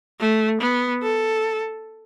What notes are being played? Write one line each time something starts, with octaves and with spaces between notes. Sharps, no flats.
A3
B3
A4